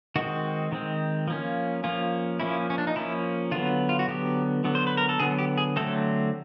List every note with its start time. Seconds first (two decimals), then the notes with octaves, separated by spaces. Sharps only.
0.16 D#3 G#3 C4 F#4
0.72 D#3 G#3 C4
1.28 F3 A#3 C#4
1.84 F3 A#3 C#4 F4
2.40 F3 A#3 C#4 E4
2.70 C#4
2.78 D4
2.87 D#4
2.96 F3 A#3 C#4 E4
3.51 D3 F#3 B3 F4
3.89 F4
3.99 F#4
4.08 D3 F#3 B3 G4
4.64 D3 F#3 B3
4.75 C5
4.87 B4
4.97 A#4
5.09 A4
5.20 D3 F#3 B3 G#4
5.39 G4
5.58 G#4
5.76 D3 F#3 A3 C4 A4